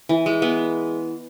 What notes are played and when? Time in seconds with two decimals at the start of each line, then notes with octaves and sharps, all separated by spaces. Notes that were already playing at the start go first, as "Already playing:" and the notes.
0.09 E3
0.26 G#3
0.42 B3